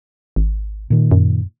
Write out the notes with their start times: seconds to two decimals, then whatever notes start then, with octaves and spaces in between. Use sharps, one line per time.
0.36 G#1
0.90 A#2 D#3
1.11 F#2